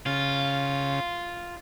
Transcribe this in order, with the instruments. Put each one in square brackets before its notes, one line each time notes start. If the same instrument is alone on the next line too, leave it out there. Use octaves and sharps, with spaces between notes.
[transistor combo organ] C#3 [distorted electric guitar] F4